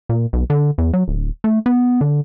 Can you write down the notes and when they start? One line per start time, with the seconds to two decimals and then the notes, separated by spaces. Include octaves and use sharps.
0.09 A#2
0.33 B1
0.50 D3
0.78 E2
0.93 F#3
1.08 D1
1.44 A3
1.66 B3
2.01 D3